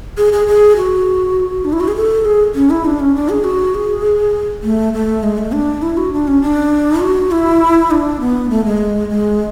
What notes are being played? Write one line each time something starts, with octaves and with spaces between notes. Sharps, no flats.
G#4
G#4
G#4
F#4
D4
E4
F#4
G#4
A4
G#4
C#4
E4
D4
C#4
D4
G#4
F#4
G#4
A3
A3
G#3
A3
D4
E4
F#4
D4
C#4
D4
F#4
E4
D4
B3
A3
G#3
G#3